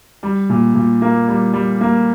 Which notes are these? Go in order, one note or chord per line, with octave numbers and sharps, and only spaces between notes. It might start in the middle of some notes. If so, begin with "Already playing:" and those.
G3
A#2
A#2
A#3
G3
G3
A#3